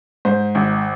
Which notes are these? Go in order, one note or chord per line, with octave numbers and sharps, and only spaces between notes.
G#2 C5
G#1